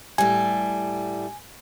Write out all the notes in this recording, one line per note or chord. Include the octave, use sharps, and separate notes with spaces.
A2 G3 G#5